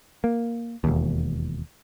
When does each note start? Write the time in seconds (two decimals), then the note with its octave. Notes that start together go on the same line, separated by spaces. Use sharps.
0.24 A#3
0.84 E1 D#2